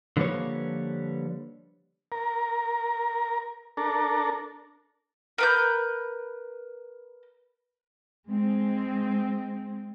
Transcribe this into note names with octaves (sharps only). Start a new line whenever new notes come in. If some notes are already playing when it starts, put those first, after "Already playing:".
D3 F3 G3 A#3 B4 C#5
A#4
D4 A4 A#4
A#4 B4 G6
G#3 C4